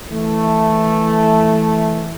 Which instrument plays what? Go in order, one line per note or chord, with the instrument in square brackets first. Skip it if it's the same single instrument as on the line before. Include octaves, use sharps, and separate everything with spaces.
[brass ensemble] E3 A3